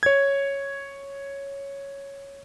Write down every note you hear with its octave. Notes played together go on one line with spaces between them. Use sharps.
C#5 G#6